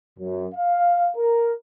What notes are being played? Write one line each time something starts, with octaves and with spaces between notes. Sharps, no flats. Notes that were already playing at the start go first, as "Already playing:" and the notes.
F#2
F5
A#4